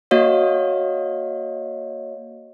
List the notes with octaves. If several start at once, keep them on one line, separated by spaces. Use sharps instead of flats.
A#3 F#4 C#5 D#5 F5